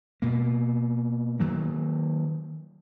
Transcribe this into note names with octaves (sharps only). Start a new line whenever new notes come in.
B2 A#3
D#3 F#3 A#3